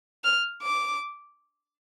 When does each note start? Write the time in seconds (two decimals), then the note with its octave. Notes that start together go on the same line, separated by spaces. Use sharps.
0.24 F6
0.62 D6